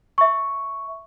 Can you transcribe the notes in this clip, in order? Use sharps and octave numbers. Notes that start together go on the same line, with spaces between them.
E5 C#6